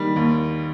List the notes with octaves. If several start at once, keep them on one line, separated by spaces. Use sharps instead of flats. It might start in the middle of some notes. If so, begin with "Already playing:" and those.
Already playing: D#3 G3
D#2